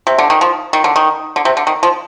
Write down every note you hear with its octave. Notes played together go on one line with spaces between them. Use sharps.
C3
D3
D#3
F3
D#3
D3
D#3
D3
C3
D3
D#3
F3